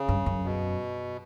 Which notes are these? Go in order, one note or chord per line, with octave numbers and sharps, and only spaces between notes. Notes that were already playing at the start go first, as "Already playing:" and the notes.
Already playing: C#3
G2
F#2
B2